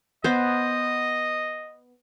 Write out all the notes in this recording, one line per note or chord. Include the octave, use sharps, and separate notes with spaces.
B3 C5 D#5